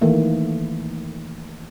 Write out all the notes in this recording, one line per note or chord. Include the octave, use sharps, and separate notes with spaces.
D#3 E3 A3 A#3